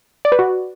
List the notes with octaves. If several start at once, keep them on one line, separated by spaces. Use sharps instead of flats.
D5
B4
F#4